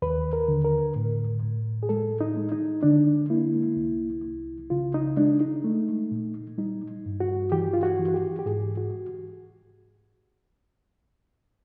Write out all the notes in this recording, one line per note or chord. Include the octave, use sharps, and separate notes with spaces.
D#2 B4
A#4
D3
A#4
A2
A2
G#4
G#3 A4
D#4
G#3
D#4
D3 D4
A#3 E4
C2
C2
C#3 F4
D#4
G#3 D4
D#4
A3
A#2
G3 D#4
G2
F#4
E3 G4
F4
F#4
E3
F#4
G4
G4
G#2 G#4
F#4